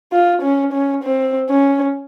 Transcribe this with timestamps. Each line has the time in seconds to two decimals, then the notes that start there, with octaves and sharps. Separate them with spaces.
0.12 F4
0.43 C#4
0.73 C#4
1.04 C4
1.49 C#4